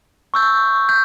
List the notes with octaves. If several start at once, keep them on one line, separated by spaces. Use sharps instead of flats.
C#6 E6 G6
G6